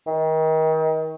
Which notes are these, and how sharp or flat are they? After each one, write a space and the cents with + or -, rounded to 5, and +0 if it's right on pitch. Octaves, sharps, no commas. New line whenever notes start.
D#3 +30